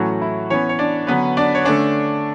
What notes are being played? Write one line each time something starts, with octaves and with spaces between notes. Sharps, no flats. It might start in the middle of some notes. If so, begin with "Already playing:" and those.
Already playing: A2 E3 F#3 A3 C#4 F#4
E4
E3 B3 C#4 C#5
C#5
D4 D5
D3 F#3 B3 C#4 B4
D4 D5
C#5
D3 A3 C#4 D4 D5